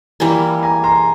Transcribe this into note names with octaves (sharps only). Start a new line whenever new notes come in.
E3 G3 A#3 G#5 A#5
G#5 A#5
A#5 C6